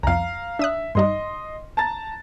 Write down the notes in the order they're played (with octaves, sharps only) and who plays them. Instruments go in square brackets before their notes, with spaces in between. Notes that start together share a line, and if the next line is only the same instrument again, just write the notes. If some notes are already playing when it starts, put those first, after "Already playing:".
[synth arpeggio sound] C2 F2 [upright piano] F5 A#5
[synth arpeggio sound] D4 D#6 F#6 [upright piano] E5
[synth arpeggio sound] G2 G3 D#4 [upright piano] D#5 C6
[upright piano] A5 A#5 A6